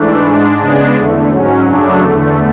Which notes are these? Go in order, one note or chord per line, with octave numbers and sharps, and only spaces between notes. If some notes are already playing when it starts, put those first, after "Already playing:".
Already playing: G#2 E3 A3 D4
G#2 G#3 D4
C#3 G#3 B3 D4
E2 D3 A3
G#2 F#3 C#4
F#2 C#3 F#3 A3 D4
E2 D3 A3